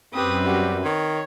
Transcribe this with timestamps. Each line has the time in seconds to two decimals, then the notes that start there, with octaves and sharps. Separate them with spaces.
0.14 F#2 C4 G4 B4 D#6
0.46 G3 F#4 G4
0.84 D#3 C#5